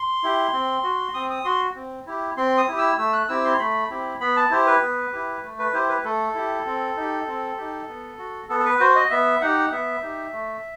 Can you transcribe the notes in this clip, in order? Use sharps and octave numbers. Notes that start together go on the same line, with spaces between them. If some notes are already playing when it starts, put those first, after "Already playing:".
Already playing: C6
E4 G4
C4
F#4
C4 D#6
D#6
F#4 C6
C4
E4 G4
C4 C6
D#6
E4 G4
E6
A3 E6
F#6
C4 E4 G4 E6
C6
A3 B5
C4 E4 G4
B3 B5
A5
E4 G4 C5
B4
B3
E4 G4
A3
B4
E4 G4 C5
B4
A3 A4
E4 G4
C4
D#4 G4
C4
D#4 G4
B3
F#4
B3 A4
A4
B4
F#4 C5
D#5
B3 E5
D#4 G4 F#5
B3 E5
D#4 G4
A3